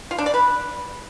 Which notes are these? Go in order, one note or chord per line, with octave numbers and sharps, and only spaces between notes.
F4
D4
D5
B4